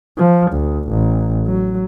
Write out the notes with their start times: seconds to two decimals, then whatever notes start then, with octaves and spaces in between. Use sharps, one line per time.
0.18 F3
0.52 D2
0.90 A1
1.47 F#3